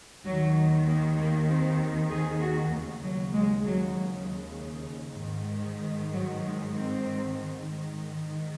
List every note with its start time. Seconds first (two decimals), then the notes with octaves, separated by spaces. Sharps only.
0.24 D#2 D#3 F#3
0.87 A#3
1.17 A#3
1.49 C4
2.10 G#4
2.41 F#4
2.72 D#2 C#3 A#3
3.03 F#3
3.34 G#3
3.65 F#3
5.20 G#2 D#3
6.13 F#3
6.44 G#3
6.74 C4
7.67 G#2 D#3